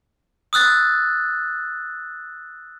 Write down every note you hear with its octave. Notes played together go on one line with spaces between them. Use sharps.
D#6 E6 F#6 A6